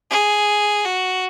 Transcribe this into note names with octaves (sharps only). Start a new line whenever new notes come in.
G#4
F#4